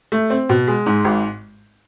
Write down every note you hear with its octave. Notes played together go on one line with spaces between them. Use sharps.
A3
C4
B2
G#3
G#2
G#1